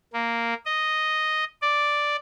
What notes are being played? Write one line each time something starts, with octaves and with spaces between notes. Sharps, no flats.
A#3
D#5
D5